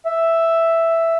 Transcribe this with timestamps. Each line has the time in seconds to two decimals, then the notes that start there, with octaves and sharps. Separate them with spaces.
0.05 E5